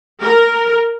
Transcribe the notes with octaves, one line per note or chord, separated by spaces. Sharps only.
A#4